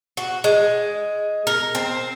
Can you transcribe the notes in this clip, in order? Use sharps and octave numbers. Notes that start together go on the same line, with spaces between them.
F#4
G#3
A#4
C4